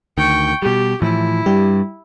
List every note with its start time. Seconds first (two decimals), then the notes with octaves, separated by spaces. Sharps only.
0.18 D2 D#3 G5 C#6
0.62 B2 G3 G4
1.02 A2 E3 F3 E4
1.46 G2 G3 G4